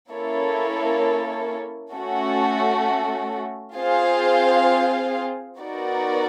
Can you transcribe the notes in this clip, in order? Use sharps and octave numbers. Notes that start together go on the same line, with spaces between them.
A#3 C#4 E4 A4 C#5
A3 C#4 F#4 A4
C4 F4 G#4 C5 F5
B3 D#4 F#4 A#4 D5